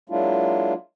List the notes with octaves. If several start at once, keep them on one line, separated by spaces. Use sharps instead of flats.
F#3 G#3 A#3 D4 E4 F4